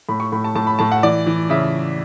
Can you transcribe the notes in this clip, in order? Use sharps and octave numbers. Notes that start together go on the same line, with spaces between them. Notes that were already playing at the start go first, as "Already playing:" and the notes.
A2 B5
C#6
A2 B5
A5
A2 A5
B5
A2 A5
F#5
E3 D5
E3
C#3 E5